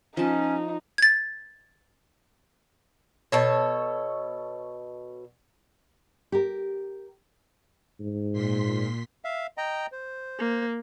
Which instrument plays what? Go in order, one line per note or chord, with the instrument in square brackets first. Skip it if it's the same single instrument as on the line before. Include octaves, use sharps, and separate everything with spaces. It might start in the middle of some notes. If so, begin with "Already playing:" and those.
[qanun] F3 A5 [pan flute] C#4 [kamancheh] D#4
[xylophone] G#6 A6
[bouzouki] B2 A4 C#5
[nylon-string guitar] G4 A#4
[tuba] G#2
[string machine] A#2 C6 B6
[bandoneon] E5 F5
D#5 G5 A#5
C5
[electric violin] A#3